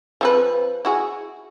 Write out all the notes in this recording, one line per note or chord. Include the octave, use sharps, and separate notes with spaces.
F3 C4 B4
E4 F#4 G#4